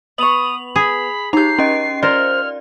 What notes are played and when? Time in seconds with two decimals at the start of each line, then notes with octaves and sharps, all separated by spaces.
0.18 B3 C#6 D#6 F7 F#7
0.76 G#4 B5
1.33 D#4 G4 A#5 G6 C7
1.59 C#4 D#5
2.03 F4 A#4 C5 D5 F6